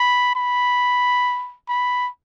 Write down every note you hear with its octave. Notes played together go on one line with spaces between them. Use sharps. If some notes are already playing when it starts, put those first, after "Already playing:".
Already playing: B5
B5
B5